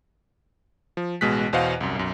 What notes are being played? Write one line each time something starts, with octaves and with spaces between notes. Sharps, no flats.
F3
A1 B2 G#3 F#6 B6
E2 B2 C5 D#5 F5 F#5
C2 F#2
B1 F#2